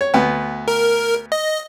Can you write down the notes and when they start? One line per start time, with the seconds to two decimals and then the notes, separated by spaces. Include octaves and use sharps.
0.01 C#5
0.14 D2 B3
0.68 A#4
1.32 D#5